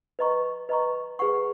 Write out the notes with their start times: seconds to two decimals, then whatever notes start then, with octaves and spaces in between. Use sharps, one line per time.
0.19 B4 D#5 A#5 C#6
0.69 B4 D#5 A#5 C#6
1.19 G#4 B4 F#5 C#6